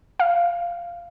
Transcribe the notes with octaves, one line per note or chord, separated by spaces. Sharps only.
F5